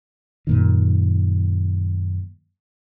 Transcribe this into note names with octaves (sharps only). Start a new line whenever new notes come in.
F#2 A#2 D#3